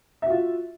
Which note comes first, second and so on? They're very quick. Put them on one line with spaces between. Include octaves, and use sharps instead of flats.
E5 F#4 F4